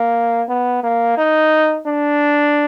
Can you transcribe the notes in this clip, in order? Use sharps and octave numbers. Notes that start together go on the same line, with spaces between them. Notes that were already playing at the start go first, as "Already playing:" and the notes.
Already playing: A#3
B3
A#3
D#4
D4